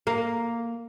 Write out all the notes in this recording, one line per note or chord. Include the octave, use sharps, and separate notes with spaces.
A#3